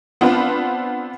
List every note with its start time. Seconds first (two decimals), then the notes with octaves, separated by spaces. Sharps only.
0.21 B3 C4 D4 F4 B4